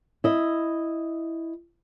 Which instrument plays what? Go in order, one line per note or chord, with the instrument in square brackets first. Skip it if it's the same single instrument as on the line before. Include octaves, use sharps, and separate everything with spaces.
[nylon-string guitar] E4 D#5